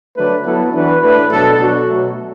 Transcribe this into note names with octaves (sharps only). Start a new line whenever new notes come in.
D3 F#3 A3 D4 B4
F#3 B3 E4 A4
E3 D4 F#4 B4
A2 A3 D4 B4
B2 F#3 D4 A4
B2 F#3 D4 F#4
B2 F#3 A3